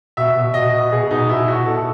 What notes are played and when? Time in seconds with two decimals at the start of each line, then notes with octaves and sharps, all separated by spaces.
0.17 B2 E5
0.36 B2
0.54 B2 D#5
0.73 B2
0.92 B2 G#4
1.11 B2 D#4
1.29 B2 E4
1.48 B2 F#4
1.66 B2 A4